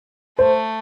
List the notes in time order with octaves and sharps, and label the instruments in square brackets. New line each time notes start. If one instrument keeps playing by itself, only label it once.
[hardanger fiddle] A3 [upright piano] C5